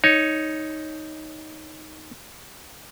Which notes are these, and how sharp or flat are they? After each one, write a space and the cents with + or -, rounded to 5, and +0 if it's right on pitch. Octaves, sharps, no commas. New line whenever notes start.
D#4 +5 C#5 +0